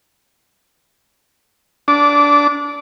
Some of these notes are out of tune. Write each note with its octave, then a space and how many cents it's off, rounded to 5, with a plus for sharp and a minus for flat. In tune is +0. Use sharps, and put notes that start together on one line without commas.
D4 -20 A5 -10 D6 -10